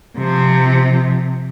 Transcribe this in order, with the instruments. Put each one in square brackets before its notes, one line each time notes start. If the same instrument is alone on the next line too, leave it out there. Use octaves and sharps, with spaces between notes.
[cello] C3 F3